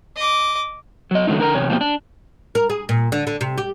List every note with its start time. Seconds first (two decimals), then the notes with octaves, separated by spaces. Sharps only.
0.16 D#5 D6
1.11 F#3 D#5
1.27 D3 D#3 F#3 G#3 A3 D#4
1.39 D3 A#4 A#5
1.54 E2 C3 C#5
1.69 B2 F3 A#3 C4 G4
1.81 D4
2.55 A#4
2.70 G#4
2.89 A#2
3.12 D3
3.27 D3
3.41 C3
3.58 G4